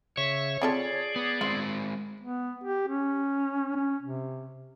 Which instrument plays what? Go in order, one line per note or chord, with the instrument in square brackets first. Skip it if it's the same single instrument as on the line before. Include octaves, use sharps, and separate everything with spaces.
[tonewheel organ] C#3 E5 C#6 [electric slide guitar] C#5
[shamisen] C4 F4 A4 [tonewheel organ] G#4 D5
[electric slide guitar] B3
[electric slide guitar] G#3 C4 [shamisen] F4
[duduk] B3
G4
C#4
C#4
C3